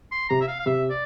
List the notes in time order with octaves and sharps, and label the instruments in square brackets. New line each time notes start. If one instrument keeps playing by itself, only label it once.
[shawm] C6
[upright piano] C3 [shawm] A#5
[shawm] E5
F5
F5
[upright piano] C3 [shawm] E5
[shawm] D5